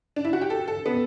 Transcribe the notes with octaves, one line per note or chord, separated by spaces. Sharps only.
D4
E4
F#4
G4
A4
A4
B3